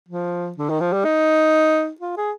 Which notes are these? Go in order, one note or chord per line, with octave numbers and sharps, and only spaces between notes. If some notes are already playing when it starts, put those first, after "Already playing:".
F3
D3
D#3
F3
G3
D#4
F4
G#4